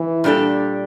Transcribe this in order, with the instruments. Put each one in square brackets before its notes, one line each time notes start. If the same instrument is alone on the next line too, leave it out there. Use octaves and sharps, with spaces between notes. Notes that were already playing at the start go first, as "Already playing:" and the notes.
Already playing: [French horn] E3
[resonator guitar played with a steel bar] A#2 G3 D4 A4